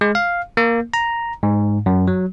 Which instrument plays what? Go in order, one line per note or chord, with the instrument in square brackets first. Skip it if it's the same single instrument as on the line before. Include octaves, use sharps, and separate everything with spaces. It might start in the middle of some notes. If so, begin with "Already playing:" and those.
[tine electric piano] G#3
F5
A#3
A#5
G#2
F#2
F#3